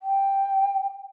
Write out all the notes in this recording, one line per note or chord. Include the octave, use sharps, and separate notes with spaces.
G5